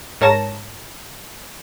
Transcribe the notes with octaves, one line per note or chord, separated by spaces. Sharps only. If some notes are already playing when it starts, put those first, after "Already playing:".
G#2 A#4 C#5 A5 A#6 E7